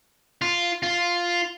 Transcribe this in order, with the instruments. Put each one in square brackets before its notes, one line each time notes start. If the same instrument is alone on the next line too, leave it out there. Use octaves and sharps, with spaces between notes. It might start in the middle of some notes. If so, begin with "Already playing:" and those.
[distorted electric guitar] F4
F4